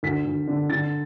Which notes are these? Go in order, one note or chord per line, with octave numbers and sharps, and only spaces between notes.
D2 B6
D2
D3
D3 A6